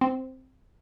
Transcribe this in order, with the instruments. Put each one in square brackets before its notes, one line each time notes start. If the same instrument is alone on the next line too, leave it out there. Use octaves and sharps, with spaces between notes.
[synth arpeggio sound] C4